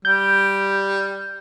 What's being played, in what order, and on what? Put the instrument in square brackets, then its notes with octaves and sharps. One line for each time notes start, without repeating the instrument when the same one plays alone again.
[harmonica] G3 [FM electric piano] G6